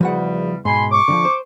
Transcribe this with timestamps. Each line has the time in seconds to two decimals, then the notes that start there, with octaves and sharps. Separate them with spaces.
0.01 E2 C#3 F3 G3 F#4 F#5
0.65 G#2 B2 G#5 B5 C6
0.91 C#6 D6
1.08 D3 E3 F3
1.25 C5